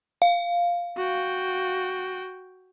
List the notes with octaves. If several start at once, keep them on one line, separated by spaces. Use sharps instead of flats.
F5
F#4 G5